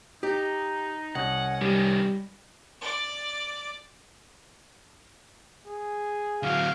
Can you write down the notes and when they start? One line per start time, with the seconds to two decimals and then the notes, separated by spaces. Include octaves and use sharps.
0.23 D#4 G4
1.15 C2 C#4 C#5 D#5 F#5
1.61 C3 D#3 G3
2.81 D5 D6
5.67 G#4
6.43 D3 F#3 F5